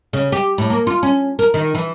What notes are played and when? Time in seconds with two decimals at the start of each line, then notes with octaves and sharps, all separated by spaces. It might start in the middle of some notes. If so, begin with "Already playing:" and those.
0.13 C#3
0.32 G4
0.58 A2
0.70 A#3
0.87 F4
1.03 C#4
1.39 A#4
1.54 D#3
1.75 E3